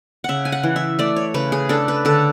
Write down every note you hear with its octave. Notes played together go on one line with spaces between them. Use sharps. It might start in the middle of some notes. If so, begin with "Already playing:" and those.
C#3 E5 F#5
G#5
F#5
E3
E5
A3 D5
C#5
C#3 B4
G#4
D4 A4
B4
D3 A4